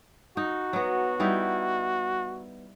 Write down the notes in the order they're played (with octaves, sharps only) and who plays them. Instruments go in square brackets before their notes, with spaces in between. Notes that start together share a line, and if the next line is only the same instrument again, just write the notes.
[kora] D#4 [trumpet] F#4
[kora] F#3 B3
G3 D#4 E4